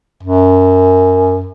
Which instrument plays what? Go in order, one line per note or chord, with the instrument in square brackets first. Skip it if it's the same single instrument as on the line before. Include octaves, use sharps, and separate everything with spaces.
[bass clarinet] F#2